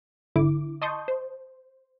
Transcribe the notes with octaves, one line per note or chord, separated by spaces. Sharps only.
G#1 D3 E4 D6
D#5 A5 C6 C#6 D#6 G6
C5